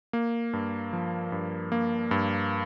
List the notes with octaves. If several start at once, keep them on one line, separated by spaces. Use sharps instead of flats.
A#3
G2
F3
G2
A#3
G2